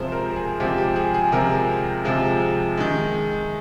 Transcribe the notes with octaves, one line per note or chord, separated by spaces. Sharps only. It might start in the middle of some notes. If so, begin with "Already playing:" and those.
Already playing: C3 F3 G#3 C5
A#4
G#4
C3 F3 G#3 G4
G4
G#4
G#4
C3 F3 G#3 A#4
C3 F3 G#3
D#3 G#3